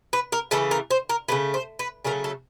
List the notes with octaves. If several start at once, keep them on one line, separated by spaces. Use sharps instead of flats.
B4
A#4
C#3 E3 A3 A4
A#4
C5
A#4
C#3 F#3 A3 B4
C5
B4
C#3 F#3 A3 A#4
A4